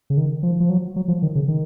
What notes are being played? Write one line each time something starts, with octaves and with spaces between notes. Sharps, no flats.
C#3
D#3
F3
F3
F#3
F#3
F3
D#3
C#3
D#3